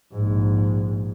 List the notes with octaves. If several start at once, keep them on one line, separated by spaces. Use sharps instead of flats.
A#1 G#2